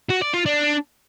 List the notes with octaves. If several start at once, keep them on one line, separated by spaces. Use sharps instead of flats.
F#4
D5
F4
D4